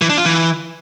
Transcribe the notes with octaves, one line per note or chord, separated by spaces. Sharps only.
E3
D4
F4
E3